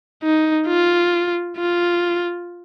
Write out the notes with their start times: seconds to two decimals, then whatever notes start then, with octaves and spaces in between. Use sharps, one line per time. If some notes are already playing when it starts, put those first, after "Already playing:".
0.23 D#4
0.68 F4
1.57 F4